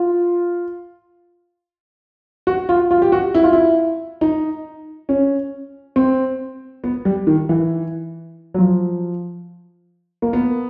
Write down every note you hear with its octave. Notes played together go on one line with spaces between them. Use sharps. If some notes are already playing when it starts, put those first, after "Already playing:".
Already playing: F4
F#4
F4
F4
G4
F#4
E4
F4
E4
D#4
C#4
C4
B3
G3
D#3
E3
F#3
F3
A#3
B3